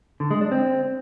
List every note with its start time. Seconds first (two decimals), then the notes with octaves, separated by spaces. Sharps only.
0.20 D3
0.31 G#3
0.41 D4
0.51 C4